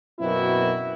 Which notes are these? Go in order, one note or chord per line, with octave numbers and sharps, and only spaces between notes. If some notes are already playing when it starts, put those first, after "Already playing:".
F#2 B2 A#3 C4 E4 F#4